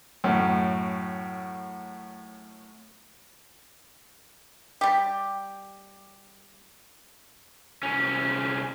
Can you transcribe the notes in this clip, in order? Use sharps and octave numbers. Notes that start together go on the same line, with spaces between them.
F#2 A2
G3 G4
C2 C#4